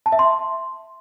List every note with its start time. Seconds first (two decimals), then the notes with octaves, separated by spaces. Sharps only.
0.06 A5
0.12 E5
0.19 C6